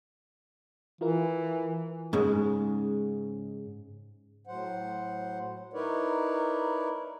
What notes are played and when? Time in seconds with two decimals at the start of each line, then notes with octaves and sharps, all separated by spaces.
1.01 E3 E4 F4 A#4
2.13 G#2 C#3 G#3
4.47 A2 F#3 C5 F#5
5.73 D#4 E4 A#4 B4 C#5 D5